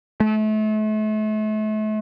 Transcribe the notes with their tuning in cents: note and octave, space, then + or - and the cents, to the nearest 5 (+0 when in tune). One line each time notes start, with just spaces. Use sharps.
A3 -35